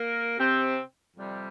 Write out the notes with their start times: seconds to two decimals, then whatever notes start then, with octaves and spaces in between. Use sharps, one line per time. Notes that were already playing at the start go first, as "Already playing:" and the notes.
Already playing: A#3 A#4
0.39 C3 C4
1.16 F2 C3 G3